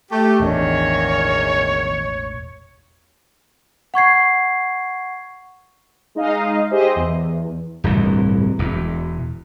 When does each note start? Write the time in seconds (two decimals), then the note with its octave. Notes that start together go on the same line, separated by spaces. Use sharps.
0.11 A3 G4
0.40 E1 A1 E2 D#3 D4 C#5
3.94 F#5 C#6 G#6 C7
6.15 G#3 D#4 D#5 F5
6.71 G4 G#4 C5 D#5 E5
6.96 E2
7.84 D1 G1 C2 E3
8.59 E1 E2